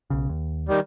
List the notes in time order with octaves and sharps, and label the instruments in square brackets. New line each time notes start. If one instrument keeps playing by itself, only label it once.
[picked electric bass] B1 C#3
D#2
[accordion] D#3 G3